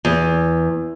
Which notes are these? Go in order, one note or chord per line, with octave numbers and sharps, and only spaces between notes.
E2